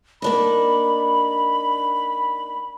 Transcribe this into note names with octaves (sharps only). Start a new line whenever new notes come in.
A#3 D4 D#4 B5